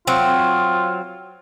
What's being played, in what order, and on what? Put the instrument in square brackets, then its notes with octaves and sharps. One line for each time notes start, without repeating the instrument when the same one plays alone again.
[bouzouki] F#3 C4 [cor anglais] F4